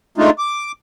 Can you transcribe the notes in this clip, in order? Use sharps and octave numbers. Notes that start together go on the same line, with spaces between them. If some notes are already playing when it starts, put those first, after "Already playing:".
G#3 A3 D4 D#4 F4
D6